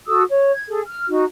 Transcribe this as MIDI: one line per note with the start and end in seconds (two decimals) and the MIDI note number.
0.08 0.22 66
0.08 0.22 69
0.08 0.22 87
0.08 0.22 88
0.30 0.52 73
0.52 0.66 92
0.69 0.80 68
0.69 0.80 69
0.87 1.06 89
1.09 1.24 63
1.09 1.24 66